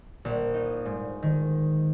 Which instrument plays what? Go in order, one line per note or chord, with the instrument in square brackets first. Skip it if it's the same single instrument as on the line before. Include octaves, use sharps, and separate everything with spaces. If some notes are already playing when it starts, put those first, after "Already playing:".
[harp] A#1
D#4
G#2
D#3